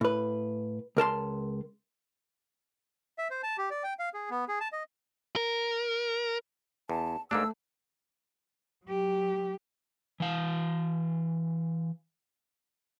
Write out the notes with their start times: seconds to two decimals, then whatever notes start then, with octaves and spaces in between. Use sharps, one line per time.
0.01 A2 B4
0.97 C#2 A#4 A5 C6
3.18 E5
3.30 C5
3.43 A5
3.58 G4
3.70 D5
3.83 G5
3.99 F5
4.14 G#4
4.30 B3
4.48 G#4
4.60 A5
4.72 D#5
5.36 A#4
6.89 E2 A5
7.31 G#2 A3 A#3 D4 E6
8.86 F#3 G4
10.20 E3 F5